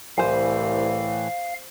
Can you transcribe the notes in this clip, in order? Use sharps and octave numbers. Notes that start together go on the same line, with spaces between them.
C2 A2 E3 C5 F5 G#5